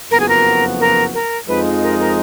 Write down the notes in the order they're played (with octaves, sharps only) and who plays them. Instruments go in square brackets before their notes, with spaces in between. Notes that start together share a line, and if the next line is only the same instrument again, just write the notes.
[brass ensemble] F#1 F2 F3 B3 F#4 [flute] A#4
[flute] G#4
A#4
A#4
A#4
[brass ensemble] F2 F3 G#3 D#4 [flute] B4
[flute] A#4
A#4